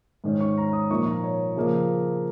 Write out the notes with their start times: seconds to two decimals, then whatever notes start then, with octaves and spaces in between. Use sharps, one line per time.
0.24 G#2 D#3 C#4
0.40 C#6
0.58 A#5
0.73 D#6
0.90 A#2 F3 A#3 D#4 C#6
1.06 A#5
1.23 C#5
1.56 C#3 F3 A#3